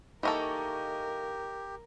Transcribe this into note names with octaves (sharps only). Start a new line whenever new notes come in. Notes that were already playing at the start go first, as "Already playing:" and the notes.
E3 A#3 D#4 G4 A4 A#4 D#5 C#6